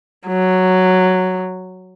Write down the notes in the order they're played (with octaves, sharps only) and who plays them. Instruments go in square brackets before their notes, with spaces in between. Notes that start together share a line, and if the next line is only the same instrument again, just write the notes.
[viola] F#3